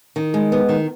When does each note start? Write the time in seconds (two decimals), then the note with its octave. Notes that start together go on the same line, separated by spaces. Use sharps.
0.16 D#3
0.34 G#3
0.52 B3
0.69 D#3